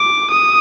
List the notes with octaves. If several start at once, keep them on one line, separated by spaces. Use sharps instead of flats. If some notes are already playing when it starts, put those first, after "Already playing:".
Already playing: D6
D#6